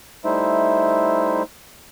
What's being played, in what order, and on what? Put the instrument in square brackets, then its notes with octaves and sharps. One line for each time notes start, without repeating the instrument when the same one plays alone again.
[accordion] G3 A3 D#4 E4 C5 E5